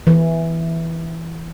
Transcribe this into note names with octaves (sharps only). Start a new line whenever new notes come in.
E3